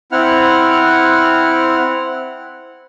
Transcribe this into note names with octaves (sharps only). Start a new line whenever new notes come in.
C4 E4 F#5 F6